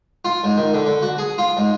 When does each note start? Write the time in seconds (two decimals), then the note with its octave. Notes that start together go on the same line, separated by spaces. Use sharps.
0.25 F4
0.44 G#2
0.57 D#3
0.74 D3
0.87 D3
1.02 F#4
1.18 G#4
1.38 F4
1.57 G#2